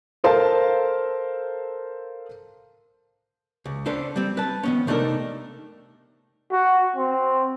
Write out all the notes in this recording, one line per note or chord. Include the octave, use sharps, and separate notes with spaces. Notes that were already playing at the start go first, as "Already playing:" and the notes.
A4 A#4 C5 F5 A5
C#2
C#4 D4 A4 B4 C5
G3 C4
B4 A5
D#3 B3 C#4
C3 A3 D4 D#4 A4 A#4
F#4
C4